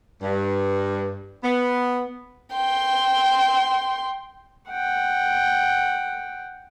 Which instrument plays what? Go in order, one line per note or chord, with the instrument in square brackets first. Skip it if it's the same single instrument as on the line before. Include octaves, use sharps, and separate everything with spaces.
[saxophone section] G2
B3
[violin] G5 C6
[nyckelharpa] F#5 G5